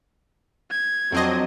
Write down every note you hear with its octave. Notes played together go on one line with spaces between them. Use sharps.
G#6
F2 F#3 C4 D4 F#4 D#5